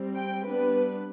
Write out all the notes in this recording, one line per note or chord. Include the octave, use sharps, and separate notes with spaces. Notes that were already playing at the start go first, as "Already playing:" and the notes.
Already playing: G3 C4
G5
G3 B3 D4 B4